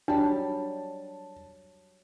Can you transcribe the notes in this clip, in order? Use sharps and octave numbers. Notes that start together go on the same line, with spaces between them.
F#3 G3 D4 A5